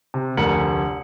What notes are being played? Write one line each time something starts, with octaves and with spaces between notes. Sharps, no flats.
C3
F1 D2 A#4 C#7 F#7